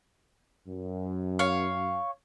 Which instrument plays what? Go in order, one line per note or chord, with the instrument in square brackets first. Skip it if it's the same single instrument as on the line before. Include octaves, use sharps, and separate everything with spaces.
[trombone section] F#2
[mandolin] C#5 F5